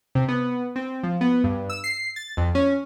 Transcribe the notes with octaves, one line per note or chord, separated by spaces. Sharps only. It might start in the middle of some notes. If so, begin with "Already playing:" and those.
C3
B3
C4
F3
B3
G2
E6
C7
A6
F2
C#4